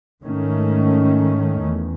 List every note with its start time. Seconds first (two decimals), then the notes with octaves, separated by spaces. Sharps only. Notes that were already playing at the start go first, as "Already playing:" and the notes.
0.23 G#2 D#3 A3 C#4
1.66 E2